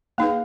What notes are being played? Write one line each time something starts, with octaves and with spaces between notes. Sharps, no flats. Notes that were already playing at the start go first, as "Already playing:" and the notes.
A#3 D#4 G#4 B4 F5